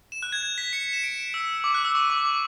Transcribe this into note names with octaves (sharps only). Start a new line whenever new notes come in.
E7
F#6
G#6
G#6
B6
C#7
C#7
E7
D7
E6
D6
F#6
E6
C#6
D6
D6